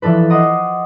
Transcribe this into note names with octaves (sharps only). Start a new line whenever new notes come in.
E3 F3 D4 A4 B4
D#5 F#5 A#5 C6 D6 D#6